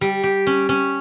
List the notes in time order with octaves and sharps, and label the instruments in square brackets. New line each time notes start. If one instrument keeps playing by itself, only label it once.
[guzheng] G3
G4
C#4
C#4